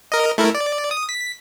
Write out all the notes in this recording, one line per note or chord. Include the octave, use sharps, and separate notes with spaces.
A#4 D#5
A3 E4 A#4
D5
D#6
B6